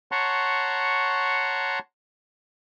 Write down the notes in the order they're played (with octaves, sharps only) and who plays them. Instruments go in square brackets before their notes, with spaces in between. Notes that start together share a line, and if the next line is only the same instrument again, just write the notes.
[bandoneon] C#5 F#5 A5 A#5 C6 C#6